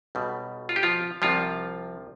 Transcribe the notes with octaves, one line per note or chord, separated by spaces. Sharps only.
B1 B2 G3
F4
G4
F3 F4
C2 C3 F3 G3 F4